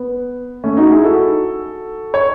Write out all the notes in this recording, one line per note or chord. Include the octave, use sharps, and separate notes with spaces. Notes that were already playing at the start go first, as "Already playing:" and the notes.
Already playing: B3
A3 C#4
D#4 F#4
E4 G#4
F#4 A4
C#5